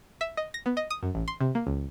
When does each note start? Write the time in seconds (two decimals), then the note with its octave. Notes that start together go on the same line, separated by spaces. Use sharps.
0.21 E5
0.37 D#5
0.54 A#6
0.66 B3
0.77 D#5
0.90 D#6
1.03 F#2
1.15 A1
1.28 C6
1.41 C3
1.55 A#3
1.67 C#2